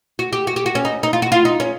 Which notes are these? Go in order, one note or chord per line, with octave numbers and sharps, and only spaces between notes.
F#4
G4
F#4
G4
F#4
C#4
D#4
D#4
F4
F#4
F4
D#4
C#4